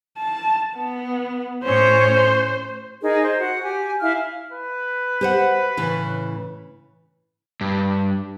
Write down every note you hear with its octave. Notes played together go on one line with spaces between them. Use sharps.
A5
B3
A2 C#4 C5 C#5
D#4 G#4 A#4
C5 D#5
F#4 F#5
G4 G#5
E4 F5 G#5 F6
B4
G4 C5 F#5
A2 C#3 E3
G2